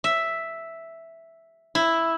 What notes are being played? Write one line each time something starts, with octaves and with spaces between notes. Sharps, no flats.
E5
E4